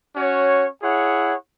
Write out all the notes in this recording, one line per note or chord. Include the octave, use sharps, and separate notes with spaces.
C#4 F#4 C#5
E4 G#4 C#5 F#5